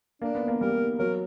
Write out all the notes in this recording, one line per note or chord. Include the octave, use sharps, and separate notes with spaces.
A#3 D4
B3
A#3
G3 A#4
F#3 A#4